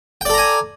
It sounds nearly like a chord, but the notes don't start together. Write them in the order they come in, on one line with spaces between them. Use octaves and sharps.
G5 D5 A4 A#5 G#5